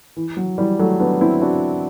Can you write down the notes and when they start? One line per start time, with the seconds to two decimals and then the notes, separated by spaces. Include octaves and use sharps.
0.17 E3
0.37 F#3
0.58 E3 G3
0.79 F#3 A3
1.00 B3 D4
1.21 C4 E4
1.42 D4 F#4